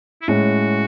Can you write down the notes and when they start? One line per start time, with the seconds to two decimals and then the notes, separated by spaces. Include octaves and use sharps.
0.22 E4
0.28 A2 G#3 C#4 F#4